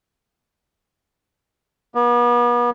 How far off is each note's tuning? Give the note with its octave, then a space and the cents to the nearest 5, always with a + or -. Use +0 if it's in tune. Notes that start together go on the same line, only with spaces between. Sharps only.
B3 -40